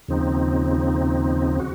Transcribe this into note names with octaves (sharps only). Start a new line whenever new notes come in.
D#2 C#3 F3 C4 D#4
F#4